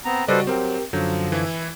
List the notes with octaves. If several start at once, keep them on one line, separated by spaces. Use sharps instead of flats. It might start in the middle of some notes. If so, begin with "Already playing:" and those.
B3 C4 A#5
C#3 G3 F#4 A4 B4 C5 D5 D#5
F#3 C4 G4 A#4 G5
F#2 D3 F3 F#3 G6
E3 E4